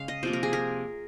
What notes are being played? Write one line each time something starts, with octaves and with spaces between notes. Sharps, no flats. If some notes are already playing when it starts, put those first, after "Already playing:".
Already playing: C#3 G#3 F5
D#5
C3 F3 A#3 C5
A#4
G#4
A#4